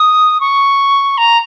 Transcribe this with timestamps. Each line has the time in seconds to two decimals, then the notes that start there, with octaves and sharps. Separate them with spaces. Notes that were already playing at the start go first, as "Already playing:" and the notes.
Already playing: D#6
0.40 C#6
1.17 A#5